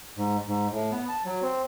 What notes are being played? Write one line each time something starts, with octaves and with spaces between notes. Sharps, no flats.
G#2
G#2
A2
B3
A5
F#3
C4